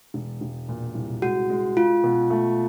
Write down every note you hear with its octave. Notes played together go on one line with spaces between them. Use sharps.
E1
E1
A#2
C2
G#3 F#4
G#3
G#3 F4
B2
A3